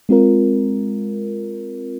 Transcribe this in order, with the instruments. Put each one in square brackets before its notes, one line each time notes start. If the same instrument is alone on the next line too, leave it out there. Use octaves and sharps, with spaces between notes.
[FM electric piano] G#3 C4 F4 A#4